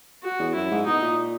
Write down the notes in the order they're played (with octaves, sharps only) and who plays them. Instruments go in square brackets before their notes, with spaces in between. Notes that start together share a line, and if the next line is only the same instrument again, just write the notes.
[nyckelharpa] F#4
[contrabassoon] E2
[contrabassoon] F#2 [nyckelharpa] E4
[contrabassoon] G#2
[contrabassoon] B2 [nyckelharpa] D#4
[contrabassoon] A#2